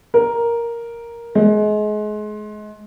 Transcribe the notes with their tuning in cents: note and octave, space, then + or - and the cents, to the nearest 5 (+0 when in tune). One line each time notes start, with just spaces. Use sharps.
A#4 +5
G#3 +30